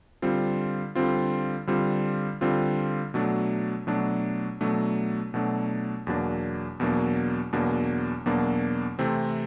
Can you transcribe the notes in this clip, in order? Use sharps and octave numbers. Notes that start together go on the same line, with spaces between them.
D3 G3 C4 F4
D3 G3 C4 F4
D3 G3 C4 F4
D3 G3 C4 F4
B2 F#3 A3 D4
B2 F#3 A3 D4
B2 F#3 A3 D4
B2 F#3 A3 D4
E2 B2 F#3 A#3 D4
E2 B2 F#3 A#3 D4
E2 B2 F#3 A#3 D4
E2 B2 F#3 A#3 D4
C3 E3 A3 C4